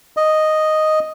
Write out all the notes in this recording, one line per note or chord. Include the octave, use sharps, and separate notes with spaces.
D#5